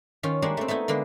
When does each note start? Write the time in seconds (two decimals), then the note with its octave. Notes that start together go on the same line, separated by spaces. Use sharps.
0.23 D#3 C#4 F4
0.42 G3 G#3 A#3 D4 F#5 G#5
0.57 A3 C4
0.68 A3 B3 D#4 E4
0.88 D3 G#3 A#3 B3